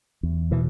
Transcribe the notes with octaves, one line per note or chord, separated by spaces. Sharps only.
E2
B2 E3